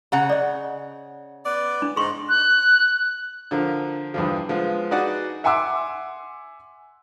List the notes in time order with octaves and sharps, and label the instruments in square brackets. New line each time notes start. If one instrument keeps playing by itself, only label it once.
[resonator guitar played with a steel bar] C#3 F#5 A#5
[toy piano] D5 D#5
[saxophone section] B3 D5
[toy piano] D4
[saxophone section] G#2 [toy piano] G#4 C6 C#6
[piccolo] F#6
[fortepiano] D3 F3 A#4
E2 G2 F3
F3 G#3 B3 F4
D#4 F#4 G#4 B4 D5 F#5
[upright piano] E5 F#5 G#5 C6 D6 E6